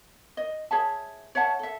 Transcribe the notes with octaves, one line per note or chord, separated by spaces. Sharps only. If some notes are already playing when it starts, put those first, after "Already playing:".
D#5
G#4 C#5 E5 A5
C#5 E5 F#5 A5
A4 E5